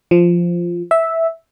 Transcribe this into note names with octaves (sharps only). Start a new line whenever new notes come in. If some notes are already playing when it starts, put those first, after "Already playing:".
F3
E5